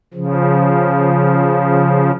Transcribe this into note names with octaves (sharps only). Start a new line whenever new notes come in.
C#3 F3